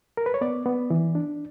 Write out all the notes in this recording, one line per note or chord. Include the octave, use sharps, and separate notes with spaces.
A#4
B4
C#5
B3 D5
B3
E3
D4